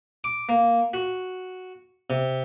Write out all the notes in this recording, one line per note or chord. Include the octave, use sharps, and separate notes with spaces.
D6
A#3
F#4
C3